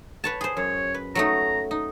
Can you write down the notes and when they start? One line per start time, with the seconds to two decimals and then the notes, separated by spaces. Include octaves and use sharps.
0.24 B4 C#5 A5
0.41 G#4 C5
0.57 F#2 C#5
0.94 B4
1.15 F#3 A3 D#4 A#5
1.71 D#4